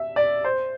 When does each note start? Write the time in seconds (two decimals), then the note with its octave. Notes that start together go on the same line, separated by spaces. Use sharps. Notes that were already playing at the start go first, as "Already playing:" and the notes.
Already playing: E5
0.16 D5
0.44 C5